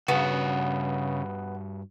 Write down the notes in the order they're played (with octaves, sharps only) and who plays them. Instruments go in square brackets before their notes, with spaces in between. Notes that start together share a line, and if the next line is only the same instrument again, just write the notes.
[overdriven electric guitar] G2 F#4 [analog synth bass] C#3 [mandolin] B3